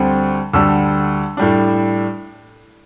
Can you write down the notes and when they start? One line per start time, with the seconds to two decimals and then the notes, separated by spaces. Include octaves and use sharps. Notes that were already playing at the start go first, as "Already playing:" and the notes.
Already playing: D2 D3 G3 C4
0.53 D2 D3 G3 E6
1.37 A2 G3 D4